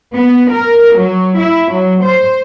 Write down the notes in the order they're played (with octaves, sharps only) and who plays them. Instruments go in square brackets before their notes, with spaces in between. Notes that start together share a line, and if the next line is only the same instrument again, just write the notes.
[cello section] B3
A#4
F#3
E4
F#3
C5